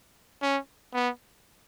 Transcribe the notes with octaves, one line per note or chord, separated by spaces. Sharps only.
C#4
B3